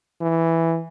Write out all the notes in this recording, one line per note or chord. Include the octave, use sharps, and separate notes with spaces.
E3